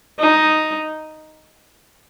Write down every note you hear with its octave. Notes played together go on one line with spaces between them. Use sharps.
D#4